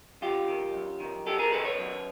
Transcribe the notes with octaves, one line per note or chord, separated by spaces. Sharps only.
F#2 F4 G4
D#3
F#2
D#3
F#2 G4 A4
G#4 A#4
D#3 A4 B4
B4 C#5
F#2